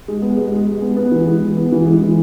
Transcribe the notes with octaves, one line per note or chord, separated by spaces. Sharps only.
G#3
B3
G#3
G#3
G#3
B3
B3
E3
G#3
E3
B3
E3
G#3
E3